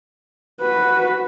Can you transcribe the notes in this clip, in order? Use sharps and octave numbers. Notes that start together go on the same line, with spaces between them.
F#4 B4